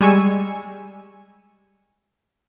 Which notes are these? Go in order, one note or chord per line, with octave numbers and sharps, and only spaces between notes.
G3 G#3 G#5 C#6 E6